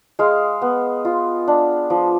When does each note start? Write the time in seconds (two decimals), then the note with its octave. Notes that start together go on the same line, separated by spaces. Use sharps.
0.19 G#3 F5
0.62 B3
1.05 F4
1.48 D4
1.90 F3